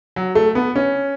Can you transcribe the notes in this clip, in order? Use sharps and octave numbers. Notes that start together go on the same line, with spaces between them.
F#3
A3
B3
C#4